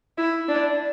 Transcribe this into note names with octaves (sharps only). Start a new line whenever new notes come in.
E4
D4